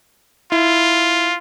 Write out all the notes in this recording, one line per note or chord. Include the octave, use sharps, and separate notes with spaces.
E4 F4